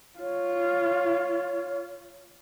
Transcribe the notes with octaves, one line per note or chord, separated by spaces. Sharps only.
F4 C#5